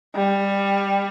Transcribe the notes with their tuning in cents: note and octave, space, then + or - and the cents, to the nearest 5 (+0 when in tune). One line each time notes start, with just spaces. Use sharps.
G3 +15